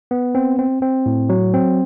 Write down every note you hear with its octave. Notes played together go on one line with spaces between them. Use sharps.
B3
C4
C4
C4
A2
F#3
C4